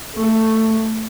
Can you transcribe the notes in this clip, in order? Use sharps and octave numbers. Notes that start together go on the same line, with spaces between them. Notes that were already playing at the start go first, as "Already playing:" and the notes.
A3